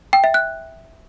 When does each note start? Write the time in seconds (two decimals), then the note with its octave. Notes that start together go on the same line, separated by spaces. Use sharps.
0.13 G5
0.24 E5
0.34 F#6